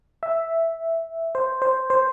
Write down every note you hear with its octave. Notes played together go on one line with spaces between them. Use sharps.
E5
C5
C5
C5